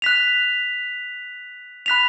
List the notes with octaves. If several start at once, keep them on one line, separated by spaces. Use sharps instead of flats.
F#6 B6 F7
B5 F#6 B6 F7